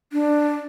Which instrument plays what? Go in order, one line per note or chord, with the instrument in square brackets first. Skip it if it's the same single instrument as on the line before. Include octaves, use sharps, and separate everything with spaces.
[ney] D4